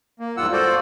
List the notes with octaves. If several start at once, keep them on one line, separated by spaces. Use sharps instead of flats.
A#3
E2 G#2 G3 F4 F#5 E6
F4 F#4 A4 C5 D5